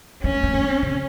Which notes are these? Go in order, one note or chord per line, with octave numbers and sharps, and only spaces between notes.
A#3 C#4
A#3
A#3
C4
C#3